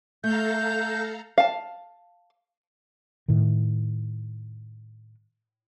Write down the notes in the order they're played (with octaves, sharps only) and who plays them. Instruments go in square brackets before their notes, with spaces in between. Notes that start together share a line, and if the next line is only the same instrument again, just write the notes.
[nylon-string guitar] A3 [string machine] A4 F5 A#5 [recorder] G6
[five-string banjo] F5 A5
[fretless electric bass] A2 D#3